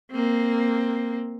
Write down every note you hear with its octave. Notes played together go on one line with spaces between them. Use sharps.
A#3 C4